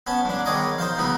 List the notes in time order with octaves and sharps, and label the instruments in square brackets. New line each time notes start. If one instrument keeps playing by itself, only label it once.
[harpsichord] B3 C#4 A5
G#2 D4
E2 D#3 C#5 D#5 D6
D#4 C5 F5
C#2 E3 B3 D#4